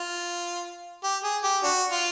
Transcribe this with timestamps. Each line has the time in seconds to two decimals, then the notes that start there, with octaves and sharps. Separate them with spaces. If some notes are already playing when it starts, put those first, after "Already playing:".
Already playing: F4
1.04 G4
1.24 G#4
1.44 G4
1.63 D4 F#4
1.92 F4